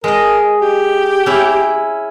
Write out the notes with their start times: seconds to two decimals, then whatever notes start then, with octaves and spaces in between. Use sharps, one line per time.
0.04 G#3 A#4 D#5
0.62 G4
1.26 C#4 E4